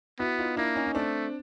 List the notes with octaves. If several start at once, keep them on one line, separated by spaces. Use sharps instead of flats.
B3 E4 F#4
D#4 F4
A#3 D4 E4
C#4 D#4
D#4
A3 C4 D4